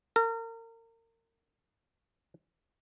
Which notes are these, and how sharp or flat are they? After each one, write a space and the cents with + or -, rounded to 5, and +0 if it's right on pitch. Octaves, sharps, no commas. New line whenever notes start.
A#4 -35